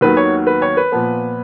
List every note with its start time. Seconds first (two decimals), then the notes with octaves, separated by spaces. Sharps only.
0.01 D#2 D#3 F#3 B3 B4
0.17 C#5
0.47 B4
0.62 C#5
0.77 B4
0.92 A#2 F3 B3